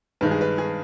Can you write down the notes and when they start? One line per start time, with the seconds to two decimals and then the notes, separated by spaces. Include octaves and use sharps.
0.21 G2 D#3 G#3 B4
0.31 G#4
0.41 B4
0.58 G#4